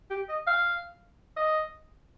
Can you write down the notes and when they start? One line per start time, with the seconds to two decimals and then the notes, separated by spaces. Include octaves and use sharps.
0.10 G4
0.29 D#5
0.47 F5
1.37 D#5